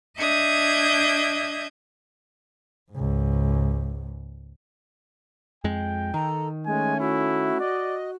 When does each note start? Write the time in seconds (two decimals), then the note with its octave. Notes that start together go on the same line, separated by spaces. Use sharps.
0.18 D4 D#5 E5 D#6 G6 G#6
2.92 C#2 G#2
5.64 F2 G#3 G5
6.14 D#3 A4 A#5
6.66 G#3 A3 C#4 G#5
7.00 E4 F#4
7.60 D5 D#5